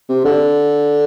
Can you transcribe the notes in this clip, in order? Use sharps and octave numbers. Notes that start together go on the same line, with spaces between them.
C3
D3